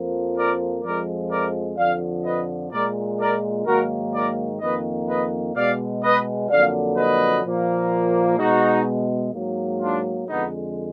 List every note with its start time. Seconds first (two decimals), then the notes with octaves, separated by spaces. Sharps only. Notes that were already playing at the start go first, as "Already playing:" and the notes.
Already playing: F2 F3 A#3
0.35 A#4 D5
0.83 F2 F3 G#3 A#4 D5
1.30 A#4 D5
1.77 F2 D3 F3 D5 F5
2.24 B4 D#5
2.72 A#2 G#3 A#4 D5
3.19 A#4 D5
3.66 G#2 D#3 F#3 A#3 F#4 A#4
4.13 A#4 D5
4.60 F2 D#3 A#3 B4 D#5
5.08 B4 D#5
5.55 B2 G#3 D5 F5
6.03 B4 D#5
6.50 F2 D3 F#3 A#3 D5 F5
6.97 B4 D#5
7.45 A#2 F3 A#3
8.38 B2 G#3 D#4 F#4
9.33 G#2 F#3 A#3
9.81 D4 F4
10.28 F2 D3 G#3 B3 D#4